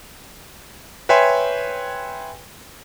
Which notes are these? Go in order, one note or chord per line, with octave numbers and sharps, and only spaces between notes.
B4 C#5 E5 G5 G#5 C6